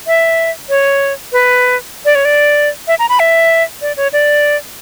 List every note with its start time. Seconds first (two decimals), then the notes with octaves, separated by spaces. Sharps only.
0.07 E5
0.69 C#5
1.32 B4
2.05 D5
2.15 C#5
2.25 D5
2.88 E5
2.99 A#5
3.09 B5
3.20 E5
3.82 D5
3.97 C#5
4.13 D5